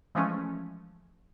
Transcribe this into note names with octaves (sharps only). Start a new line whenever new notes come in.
E3 F3 G#3 A3 C#4